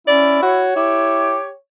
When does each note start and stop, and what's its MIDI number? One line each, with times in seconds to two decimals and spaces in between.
0.07 0.38 61
0.07 0.68 64
0.07 0.39 74
0.42 0.71 66
0.42 1.54 73
0.76 1.36 64
0.76 1.48 67